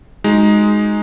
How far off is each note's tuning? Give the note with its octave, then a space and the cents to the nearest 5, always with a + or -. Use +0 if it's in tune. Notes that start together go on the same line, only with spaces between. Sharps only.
G#3 +0 D#4 +0 F#4 +0